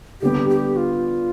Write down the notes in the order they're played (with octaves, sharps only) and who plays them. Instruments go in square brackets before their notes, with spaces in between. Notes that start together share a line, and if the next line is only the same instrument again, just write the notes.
[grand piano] D3 G3 B3 [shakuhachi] G4
[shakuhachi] G4
F4